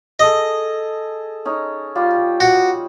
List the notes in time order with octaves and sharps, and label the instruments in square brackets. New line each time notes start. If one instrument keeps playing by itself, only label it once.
[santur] G#4 A4 [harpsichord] D#5
[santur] C#4 D#4
G3 F4 G4
[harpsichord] F#4